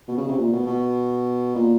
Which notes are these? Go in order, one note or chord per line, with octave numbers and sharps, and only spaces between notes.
B2
C#3
C3
A#2
B2
B2
A#2